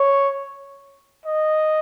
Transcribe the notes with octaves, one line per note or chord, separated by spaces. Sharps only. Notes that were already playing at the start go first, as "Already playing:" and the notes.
Already playing: C#5
D#5